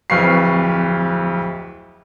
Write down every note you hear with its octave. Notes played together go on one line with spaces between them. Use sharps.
D1 F2 B4 F5 C#6 C7